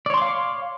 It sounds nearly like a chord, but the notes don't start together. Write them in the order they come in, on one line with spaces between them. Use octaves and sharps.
D5 C#5 C6 D6 F5